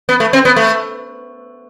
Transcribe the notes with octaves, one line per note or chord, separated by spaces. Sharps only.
B3
A3
C4
B3
A3